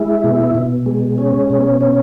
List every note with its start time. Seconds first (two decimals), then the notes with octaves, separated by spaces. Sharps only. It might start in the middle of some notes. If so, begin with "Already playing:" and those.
Already playing: G#3 E4
0.24 B2
0.55 B2
0.86 G#3
1.18 C#4
1.50 B2
1.81 C#4